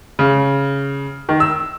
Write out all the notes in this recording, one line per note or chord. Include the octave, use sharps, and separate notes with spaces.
C#3
D#3
E6